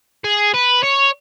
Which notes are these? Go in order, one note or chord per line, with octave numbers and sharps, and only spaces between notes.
G#4
B4
C#5